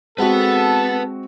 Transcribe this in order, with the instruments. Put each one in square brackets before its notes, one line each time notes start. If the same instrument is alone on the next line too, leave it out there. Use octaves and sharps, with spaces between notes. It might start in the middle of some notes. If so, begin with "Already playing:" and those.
[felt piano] G#3 C4 F#4 [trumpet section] A4 A5 [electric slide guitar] B4 F#5